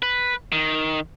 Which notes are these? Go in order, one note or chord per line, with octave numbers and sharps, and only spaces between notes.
B4
D#3